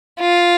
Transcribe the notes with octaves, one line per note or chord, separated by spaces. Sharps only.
F4